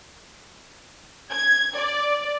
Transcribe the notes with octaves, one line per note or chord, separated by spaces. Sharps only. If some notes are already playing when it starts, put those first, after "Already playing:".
G#6
D5